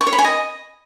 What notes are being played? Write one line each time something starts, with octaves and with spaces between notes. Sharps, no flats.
C#6
C#5
B5
G#5
D#5